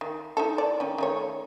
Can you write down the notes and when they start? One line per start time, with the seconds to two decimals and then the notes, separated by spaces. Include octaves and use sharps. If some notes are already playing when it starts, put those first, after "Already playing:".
0.01 D#3
0.37 D#4 E4 A4
0.58 D5
0.80 D#3 C#4
0.98 D#3 A3 C#5